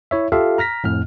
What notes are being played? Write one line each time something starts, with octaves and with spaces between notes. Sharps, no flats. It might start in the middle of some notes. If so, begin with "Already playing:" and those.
E4 C#5 E5
F4 G4 A4 E5 F5
A#5 F6 A#6 B6
F2 A2 F6